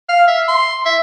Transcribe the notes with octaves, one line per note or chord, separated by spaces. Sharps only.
F5
E5
C6
E5